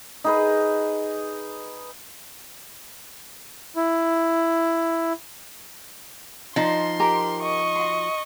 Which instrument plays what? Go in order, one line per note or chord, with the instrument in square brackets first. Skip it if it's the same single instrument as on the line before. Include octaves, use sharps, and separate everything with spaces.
[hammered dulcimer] D#4 G#4 B4
[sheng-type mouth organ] E4
[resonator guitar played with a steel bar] F3 D#4 [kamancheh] C6
[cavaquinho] G4 A#4 G#5
[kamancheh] D#5 C#6
[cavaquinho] F#4 C6